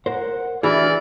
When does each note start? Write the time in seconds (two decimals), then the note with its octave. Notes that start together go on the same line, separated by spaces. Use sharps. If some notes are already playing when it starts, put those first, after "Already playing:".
0.06 A#4 C5 F#5
0.63 E3 D4 F#4 G#4 D5 F6